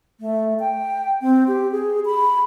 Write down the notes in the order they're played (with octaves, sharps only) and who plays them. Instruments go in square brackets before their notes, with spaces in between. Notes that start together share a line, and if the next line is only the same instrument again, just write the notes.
[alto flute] A3
G5
C4
G4
G#4
B5